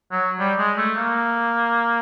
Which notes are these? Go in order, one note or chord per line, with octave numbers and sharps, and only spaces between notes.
F#3
G3
G#3
A3
A#3